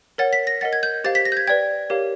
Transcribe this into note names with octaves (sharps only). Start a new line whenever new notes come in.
A#4 C#5 F#5 A6
B6
A#6
A#4 D#5 F#5 A6
G#6
G6
G4 C5 F5 A6
B6
A#6
G6
G#6
B4 D5 G5 G#6
G4 A#4 C#5 F5